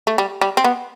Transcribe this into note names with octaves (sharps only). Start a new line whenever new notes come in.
A3
G3
G3
C4
B3